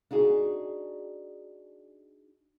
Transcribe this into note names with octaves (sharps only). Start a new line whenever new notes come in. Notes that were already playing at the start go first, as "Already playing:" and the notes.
D4 D#4 F#4 G#4